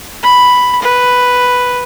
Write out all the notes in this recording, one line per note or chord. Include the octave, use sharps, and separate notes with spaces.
B5
B4